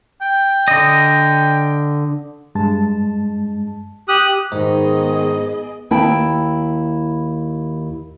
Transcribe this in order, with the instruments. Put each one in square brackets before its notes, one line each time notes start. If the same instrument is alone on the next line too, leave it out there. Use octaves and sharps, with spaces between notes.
[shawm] G5
[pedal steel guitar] D3 D#5
[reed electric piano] G2 G#3 A5
[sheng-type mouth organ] G4 D#6 F#6
[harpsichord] G#2 [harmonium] D#3 [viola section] B3 G#4 D#5
[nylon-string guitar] D#2 E4 G5 A5